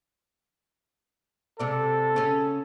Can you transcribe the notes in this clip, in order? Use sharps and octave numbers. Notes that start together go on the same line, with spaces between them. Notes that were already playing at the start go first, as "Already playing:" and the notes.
G#2 C3 A4 D5
C#3 C#4